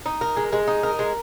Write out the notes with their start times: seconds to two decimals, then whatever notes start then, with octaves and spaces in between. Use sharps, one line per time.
0.06 D#4
0.21 A#4
0.37 G#3
0.53 G#3
0.67 D#4
0.83 A#4
0.99 G#3